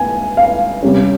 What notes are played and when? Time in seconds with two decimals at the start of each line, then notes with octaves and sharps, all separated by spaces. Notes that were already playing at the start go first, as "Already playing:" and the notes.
Already playing: A#2 G#5
0.37 F5
0.83 C3 G3 C#4